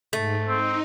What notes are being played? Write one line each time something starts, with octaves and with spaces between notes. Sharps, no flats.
G#2 A3
C4 D#4